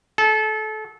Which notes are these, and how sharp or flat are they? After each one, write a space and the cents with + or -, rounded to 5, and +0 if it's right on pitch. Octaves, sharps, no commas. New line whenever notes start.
A4 -30